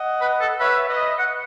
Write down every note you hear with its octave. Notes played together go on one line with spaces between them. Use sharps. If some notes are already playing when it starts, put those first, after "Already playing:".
Already playing: D#5 F#5
B4
A4
B4 C#5 E5
B4 D#5
F#5